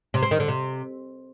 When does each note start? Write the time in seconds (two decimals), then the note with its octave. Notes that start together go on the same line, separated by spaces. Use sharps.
0.14 C3
0.23 C4
0.31 D#3
0.40 D3
0.48 C3